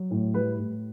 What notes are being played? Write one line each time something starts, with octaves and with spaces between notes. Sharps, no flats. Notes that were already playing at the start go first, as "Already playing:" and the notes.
Already playing: F#3
A2
G3 B4
A2